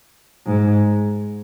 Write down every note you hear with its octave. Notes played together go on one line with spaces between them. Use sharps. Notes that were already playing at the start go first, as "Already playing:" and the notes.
G#2